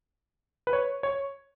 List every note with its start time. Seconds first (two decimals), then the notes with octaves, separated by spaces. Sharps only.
0.67 B4
0.73 C#5
1.03 C#5